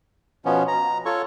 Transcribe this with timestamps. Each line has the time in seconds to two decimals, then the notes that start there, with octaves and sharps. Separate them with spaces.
0.45 B2 F3 B3 C#4
0.68 A#5
1.06 F4 A4 C#5 C#6